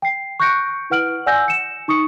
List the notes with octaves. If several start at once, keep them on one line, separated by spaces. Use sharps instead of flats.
G5 C7
C#6 F#6 G6 A#6 C#7 D7
E4 B4 F#5 F6 D7 F#7
D5 F#5 G#5 E6 G6 A#6
C#7 E7
D#4 C#6 D#6 C#7